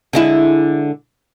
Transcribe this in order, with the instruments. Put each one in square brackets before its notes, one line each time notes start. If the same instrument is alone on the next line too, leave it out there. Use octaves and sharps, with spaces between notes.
[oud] D3 G#3 E4